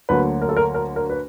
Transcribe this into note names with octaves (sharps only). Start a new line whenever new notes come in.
D2 D3 F#3 A#3 B4
A#4
A4
A#4
A#4
A#4
B4